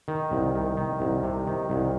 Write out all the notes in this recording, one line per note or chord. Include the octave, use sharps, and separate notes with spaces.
D#3
C2
D#3
D#3
C2
C3
D#3
C2